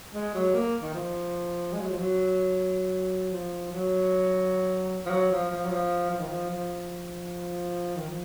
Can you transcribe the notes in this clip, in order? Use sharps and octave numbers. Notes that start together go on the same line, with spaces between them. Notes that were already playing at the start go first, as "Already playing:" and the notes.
G#3
F#3
A#3
D#3
F3
G#3
F#3
F3
F#3
F3
F#3
F3
F#3
F3
F3
F#3
F3
F3
D#3
F3
F3
D#3
F3